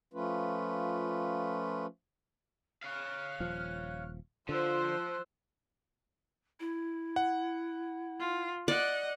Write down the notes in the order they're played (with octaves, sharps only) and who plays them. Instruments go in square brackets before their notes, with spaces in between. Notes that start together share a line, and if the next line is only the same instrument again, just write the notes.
[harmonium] F3 A3 C#4 F4 B4
[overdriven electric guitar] C#5 F5 [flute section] F6 F#6
[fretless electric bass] D#1 F3
[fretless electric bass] D3 [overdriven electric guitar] F3 [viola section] F4 C5 [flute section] E6 F#6
[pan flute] E4
[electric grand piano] F#5
[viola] F4
[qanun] D5 [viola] D#5 F#5